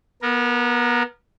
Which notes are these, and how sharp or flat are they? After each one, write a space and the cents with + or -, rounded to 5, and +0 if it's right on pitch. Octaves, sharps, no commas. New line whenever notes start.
B3 -25 A#4 +0